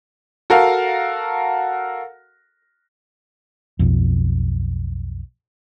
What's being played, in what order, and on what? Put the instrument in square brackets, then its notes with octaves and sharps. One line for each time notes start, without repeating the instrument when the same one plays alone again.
[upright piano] F#4 A4 A#4 F5
[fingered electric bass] B1 F2